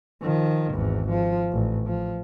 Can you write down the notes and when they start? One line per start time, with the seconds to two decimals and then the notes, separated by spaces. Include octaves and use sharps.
0.22 D#3 F3
0.73 G#1 E2
1.10 F3
1.52 A1
1.86 F3